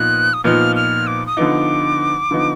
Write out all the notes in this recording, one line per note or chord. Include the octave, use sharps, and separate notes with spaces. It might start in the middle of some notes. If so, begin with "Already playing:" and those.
Already playing: A#2 F3 B3 D#4 F#6
D#6
A#2 F3 B3 D#4 F6
F6
D6
D#6
D3 F3 B3 D#4 D6
D3 F3 B3 D#4